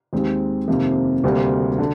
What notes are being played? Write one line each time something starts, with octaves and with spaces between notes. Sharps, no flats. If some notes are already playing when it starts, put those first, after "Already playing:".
D#2 D#3 G#3 C4
F2 C3 D#3 A#3
D2 C3 G3 A#3
D3